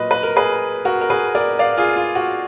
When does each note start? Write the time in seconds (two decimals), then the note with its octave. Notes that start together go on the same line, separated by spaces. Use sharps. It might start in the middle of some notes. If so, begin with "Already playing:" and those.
Already playing: A#2 F#3 A#3 B4 D#5
0.11 B4
0.23 A#4
0.36 G#4 B4
0.85 F#4 A#4
1.01 A#4
1.10 G#4 B4
1.35 A#4 D5
1.59 D5 F5
1.77 F4 G#4
1.96 F4
2.15 F#4